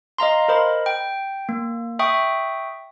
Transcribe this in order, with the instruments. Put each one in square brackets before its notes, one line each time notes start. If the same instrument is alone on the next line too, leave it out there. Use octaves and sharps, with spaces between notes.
[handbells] D#5 F5 A#5 C6
A#4 C5 D#5 B5
G5
A#3
E5 G5 C#6 D#6